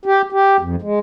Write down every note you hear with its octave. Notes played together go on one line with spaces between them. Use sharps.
G4
G4
F2
G#3